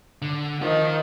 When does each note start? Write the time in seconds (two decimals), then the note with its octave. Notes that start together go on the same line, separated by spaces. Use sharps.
0.22 D3
0.62 D#3 F4 C5